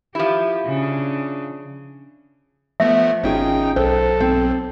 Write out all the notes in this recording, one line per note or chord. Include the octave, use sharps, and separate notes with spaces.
F3 E4 G4
C#3 D4
F3 A3 B3 E5
G#1 C#4 D#4 F4 G#4 G5
B1 A4 C5 G5
C4